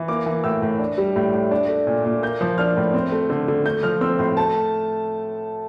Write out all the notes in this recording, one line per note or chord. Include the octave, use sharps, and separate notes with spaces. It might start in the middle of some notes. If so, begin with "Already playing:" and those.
Already playing: E3
A#3 D6
E3
A2 E6
A2
D4
G3
A2
A2
D4
A3
A#2
A#2
A#3 G6
F3
D4 F6
A2
C4
A3
D3
D3
A3 G6
F3 F6
C4 E6
A2 C6
A3 A5